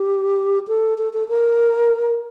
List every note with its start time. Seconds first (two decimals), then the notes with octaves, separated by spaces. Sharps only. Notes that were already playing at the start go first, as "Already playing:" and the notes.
Already playing: G4
0.68 A4
0.98 A4
1.13 A4
1.29 A#4